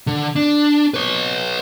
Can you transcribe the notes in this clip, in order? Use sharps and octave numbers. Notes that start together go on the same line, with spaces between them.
D3
D4
B4 C#5